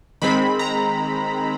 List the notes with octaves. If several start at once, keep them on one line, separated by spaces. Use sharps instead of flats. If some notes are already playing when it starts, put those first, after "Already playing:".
D#3 G#3 C4 B5
A#5